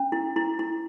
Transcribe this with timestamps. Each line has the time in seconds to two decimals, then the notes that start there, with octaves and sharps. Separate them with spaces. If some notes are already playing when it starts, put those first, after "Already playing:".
Already playing: C#4
0.12 E4
0.36 E4
0.59 E4